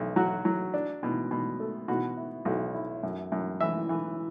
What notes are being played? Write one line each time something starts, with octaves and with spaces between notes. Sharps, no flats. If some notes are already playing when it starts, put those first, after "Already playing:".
Already playing: B1
F#3 F#4
F#3
D4
B2
B2
A3
B2 F#4
E4
B1 F#4
E4
F#2
F#2
E3 E5
E3